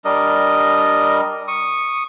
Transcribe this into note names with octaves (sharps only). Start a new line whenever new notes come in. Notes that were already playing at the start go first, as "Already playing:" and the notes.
G3 D4 A#4 D#5
C#6 D#6